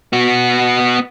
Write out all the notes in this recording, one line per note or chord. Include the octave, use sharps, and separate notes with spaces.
B3 F#4